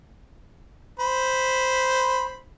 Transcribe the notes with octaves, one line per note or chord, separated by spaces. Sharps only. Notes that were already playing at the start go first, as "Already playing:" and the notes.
C5 B5